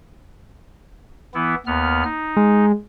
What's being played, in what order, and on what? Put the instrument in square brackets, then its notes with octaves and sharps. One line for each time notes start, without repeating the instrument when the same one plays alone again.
[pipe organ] E3 B3 E4
D#2 B3 F6
D#4
[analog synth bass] G#3